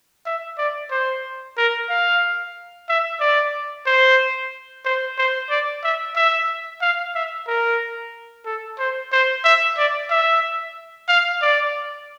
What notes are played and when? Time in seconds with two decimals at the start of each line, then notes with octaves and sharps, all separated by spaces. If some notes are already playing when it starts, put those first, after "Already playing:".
0.26 E5
0.58 D5
0.91 C5
1.57 A#4
1.89 F5
2.89 E5
3.20 D5
3.86 C5
4.85 C5
5.18 C5
5.50 D5
5.84 E5
6.16 E5
6.81 F5
7.15 E5
7.48 A#4
8.46 A4
8.78 C5
9.12 C5
9.44 E5
9.78 D5
10.10 E5
11.08 F5
11.42 D5